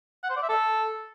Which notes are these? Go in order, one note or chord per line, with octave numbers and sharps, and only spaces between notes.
F#5
C5
D5
E5
A4